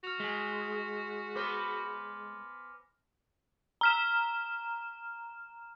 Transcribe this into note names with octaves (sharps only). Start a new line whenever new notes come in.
F#4 F6 F7
G#3 G#5 B6
B3 B4 C5 D6 F6 A#6
A#5 F6 E7